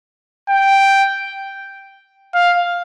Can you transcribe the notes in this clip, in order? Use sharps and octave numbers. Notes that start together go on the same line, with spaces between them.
G5
F5